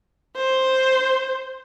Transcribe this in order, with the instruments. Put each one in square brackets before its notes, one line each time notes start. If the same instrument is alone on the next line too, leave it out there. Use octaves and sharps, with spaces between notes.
[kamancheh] C5